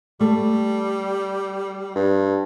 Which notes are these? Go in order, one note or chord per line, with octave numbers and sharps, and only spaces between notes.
G3 A3
G2